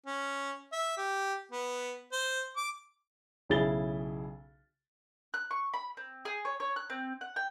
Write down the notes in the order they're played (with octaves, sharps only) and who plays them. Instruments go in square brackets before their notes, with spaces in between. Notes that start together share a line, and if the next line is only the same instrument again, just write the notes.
[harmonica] C#4
E5
G4
B3
C5
D6
[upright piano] B1 C#3 E4 G#4 A6 G7
[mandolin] F#6
C#6
B5
C4
G#4
C#5
C#5
F#6
C4
F#5
G5